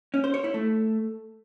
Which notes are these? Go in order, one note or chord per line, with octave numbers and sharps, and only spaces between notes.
C#4
C5
C#5
E4
A3